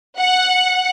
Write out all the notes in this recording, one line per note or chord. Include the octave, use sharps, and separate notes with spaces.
F#5